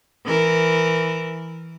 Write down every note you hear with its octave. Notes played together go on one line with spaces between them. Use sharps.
E3 A#4